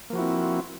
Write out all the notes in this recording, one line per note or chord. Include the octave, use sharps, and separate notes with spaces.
F3 A#3 C4 E4 F#4